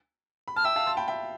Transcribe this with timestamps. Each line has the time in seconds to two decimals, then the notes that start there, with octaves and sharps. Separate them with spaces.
0.48 B5
0.56 A5 F6
0.64 E5 G5 E6
0.76 F5 A5
0.86 A5 C6
0.97 G5 B5
1.08 E5 G5